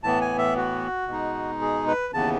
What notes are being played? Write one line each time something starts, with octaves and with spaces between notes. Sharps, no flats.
A2 E3 B3 A5
G#5
E5
F#4
B2 G#3 D#4
G#4
B4
D#2 C#3 E3 B3 A5